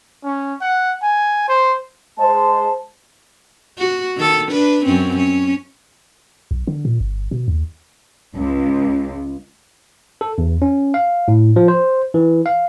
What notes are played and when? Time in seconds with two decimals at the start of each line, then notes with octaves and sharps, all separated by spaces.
0.24 C#4
0.61 F#5
1.02 G#5
1.49 C5
2.18 G#3 C5 A5
3.78 F#4
4.16 D#3 A4
4.51 D4 B4
4.85 F#2 C4 C#4
5.16 C#4
6.51 B1
6.67 D3
6.85 A#2
7.01 G1
7.31 B2
7.48 D#2
8.36 C#2
10.21 A4
10.38 E2
10.62 C#4
10.94 F5
11.28 A2
11.56 F3
11.68 C5
12.14 E3
12.46 F5